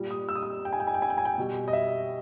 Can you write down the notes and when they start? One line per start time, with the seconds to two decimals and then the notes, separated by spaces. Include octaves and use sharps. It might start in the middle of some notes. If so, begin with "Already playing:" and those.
Already playing: A#2 G3
0.11 D#6
0.29 E6
0.35 D#6
0.43 E6
0.65 G5
0.73 G#5
0.80 G5
0.87 G#5
0.94 G5
1.02 G#5
1.10 G5
1.18 G#5
1.25 G5
1.38 B2 G3
1.68 D#5
1.73 E5